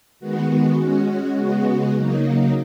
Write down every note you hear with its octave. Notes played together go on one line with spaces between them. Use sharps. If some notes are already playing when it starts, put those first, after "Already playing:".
D#3 G#3 B3 F#4
G#3 C#4 F#4
C#3 G#3 B3 F#4
C#3 F#3 A#3 D#4